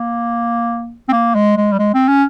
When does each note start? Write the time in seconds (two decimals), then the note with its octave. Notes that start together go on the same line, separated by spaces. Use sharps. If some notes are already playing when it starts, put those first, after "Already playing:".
Already playing: A#3
1.09 C4
1.12 A#3
1.35 G#3
1.57 G#3
1.72 G3
1.79 G#3
1.94 C4
2.08 C#4